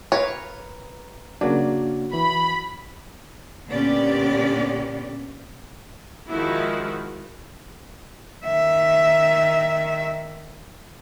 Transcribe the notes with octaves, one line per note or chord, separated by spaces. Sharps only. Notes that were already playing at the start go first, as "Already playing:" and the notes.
A#4 B4 C#5 F5
C#3 F#3 A#3 D4 D5
E3 B5
A#2 D3 B3 C#4 G4 D5
D#3 F3 G#3 E4 F#4
D#3 E5